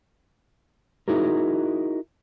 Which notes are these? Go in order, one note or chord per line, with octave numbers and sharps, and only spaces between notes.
D#4 E4 F#4 G#4 A#4